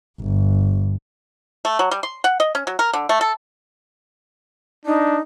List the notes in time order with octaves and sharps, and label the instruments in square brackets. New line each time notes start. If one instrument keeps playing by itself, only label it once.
[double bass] G1
[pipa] A3
F#3
G3
C6
F#5
D#5
C#4
F#3
A#4
D3
A3
A4
[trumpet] D4 [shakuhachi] D#4